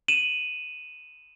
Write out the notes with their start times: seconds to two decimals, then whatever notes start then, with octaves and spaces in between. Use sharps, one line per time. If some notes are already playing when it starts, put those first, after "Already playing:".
0.08 D#7 E7 F#7